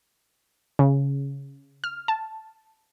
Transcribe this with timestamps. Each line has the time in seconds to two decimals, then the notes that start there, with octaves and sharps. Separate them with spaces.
0.79 C#3
1.84 F6
2.08 A5